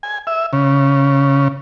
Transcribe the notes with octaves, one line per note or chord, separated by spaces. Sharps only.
G#5
E5
C#3